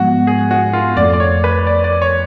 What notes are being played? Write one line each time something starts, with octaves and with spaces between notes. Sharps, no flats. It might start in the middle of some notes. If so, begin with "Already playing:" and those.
Already playing: G#2 F3 G#3 B3 F#4
G#4
F#4
F4
F2 F3 A3 D5
D5
C#5
B4
D5
D5
C#5